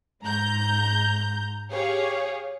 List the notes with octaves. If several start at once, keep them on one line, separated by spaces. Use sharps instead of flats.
G#2 A#5 G6
G4 G#4 C#5 F5